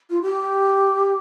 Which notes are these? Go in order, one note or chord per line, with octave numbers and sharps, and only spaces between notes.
F4
G4